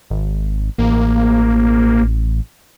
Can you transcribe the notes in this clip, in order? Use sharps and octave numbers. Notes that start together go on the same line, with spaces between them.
G#1
A1 A#3